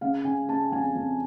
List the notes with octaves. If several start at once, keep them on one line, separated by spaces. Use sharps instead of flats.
C#3 F5
C#3 G#5
C#3 A5
F2 G#5
F2